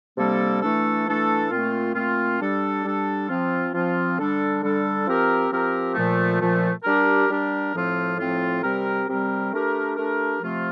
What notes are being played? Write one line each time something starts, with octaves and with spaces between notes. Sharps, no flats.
C3 G3 A#3 D4 A4
E3 A3 D4 A4
E3 A3 D4 A4
A#2 A3 C4 F4
A#2 A3 C4 F4
G3 D4 A4
G3 D4 A4
F3 C4 F4
F3 C4 F4
D3 G3 D4 A4
D3 G3 D4 A4
F3 C4 G4 A#4
F3 C4 G4 A#4
A#2 F3 A3
A#2 F3 A3
G3 D4 G4 A#4
G3 D4 G4 A#4
A2 F3 C4 F4
A2 F3 C4 F4
C3 G3 C4 G4 A#4
C3 G3 C4 G4 A#4
A3 D4 G4 A#4
A3 D4 G4 A#4
C3 F3 A3 C4 F4